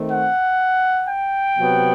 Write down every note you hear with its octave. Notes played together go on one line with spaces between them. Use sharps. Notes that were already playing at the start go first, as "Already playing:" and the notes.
Already playing: D#3 A3 C4
F#5
G5
C3 F#3 B3